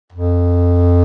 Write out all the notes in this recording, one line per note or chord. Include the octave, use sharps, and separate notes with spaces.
F2